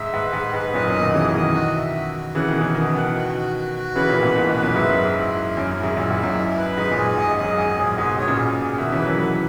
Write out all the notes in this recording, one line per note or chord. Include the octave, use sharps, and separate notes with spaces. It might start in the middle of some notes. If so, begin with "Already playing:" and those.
Already playing: G#2 E5
G#2 B4
G#2 D#4
G#2 B4
F#2 A#2 D#5
F#2 A#2
D#4
B2 D#3
C#3 E3 D#5
C#3
B2 D#3 D#5
F#4
E5
F#4
F#4
C#3 E3 F#5
B2 D#3
G#4
C#3 E3
B2 D#3 G#4
B2 D#3 F#5
F#4
F#4
F#4
F#4
C#3 E3 B4
A#2 C#3
A#3
G#2 B2
G#2 B2 A#3
G#2 B2
B4
F#2 A#2
G#2 E5
F#2
A#4
G#2
E4
A#4
F#2 C#4
F#2
E4
G#2
F#2 A#2 E5
G#2
E4
F#2
D#4
B4
G#2 D#4
F#2 A#2
G#4
G#2 D#5
G#2
F#2 D#5
G#2
G#2 G#4
F#2 A#2 G#4
G#2 B2 G#4
G#2 C#5
A#2 C#3
G#4
G#4
B2 D#3 E5
C#3 E3
B4
F#3 A#3
F#3 A#3 B4